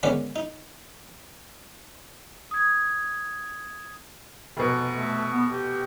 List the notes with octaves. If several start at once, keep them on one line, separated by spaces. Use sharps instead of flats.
D3 D#3 G#3 B3 C#4 D4
D#4
D#6 G#6
F1 B2
A3
B3
G4